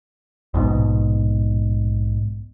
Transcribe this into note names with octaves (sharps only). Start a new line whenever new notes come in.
A#1 G#2 B2